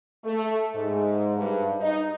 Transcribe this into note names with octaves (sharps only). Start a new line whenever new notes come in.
A3
G#2
G2
D#4